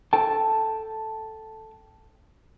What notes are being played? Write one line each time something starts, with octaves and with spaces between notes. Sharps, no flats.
A4 G5 A5